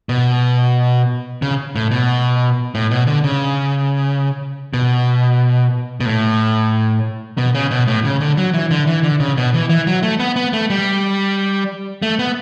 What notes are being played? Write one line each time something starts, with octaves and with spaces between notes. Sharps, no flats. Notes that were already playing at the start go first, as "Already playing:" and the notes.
B2
C#3
A2
B2
A2
B2
D3
C#3
B2
B2
A2
B2
C#3
B2
A2
C#3
D3
F#3
E3
D3
E3
D3
C#3
B2
E3
E3
F#3
A3
B3
B3
A3
G3
A3
B3